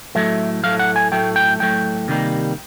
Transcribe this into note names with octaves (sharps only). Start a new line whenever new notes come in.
A2 F#3 A3 E5
A2 F#3 A3 F5
F#5
G#5
A2 F#3 A3 G5
G5
A2 F#3 A3 G5
C3 D#3 G3 A#3